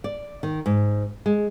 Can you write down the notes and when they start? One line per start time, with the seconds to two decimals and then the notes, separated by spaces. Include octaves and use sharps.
0.04 D5
0.43 D#3
0.66 G#2
1.26 G#3